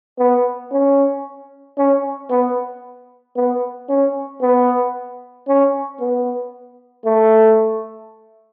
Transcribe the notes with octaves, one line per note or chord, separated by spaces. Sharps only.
B3
C#4
C#4
B3
B3
C#4
B3
C#4
B3
A3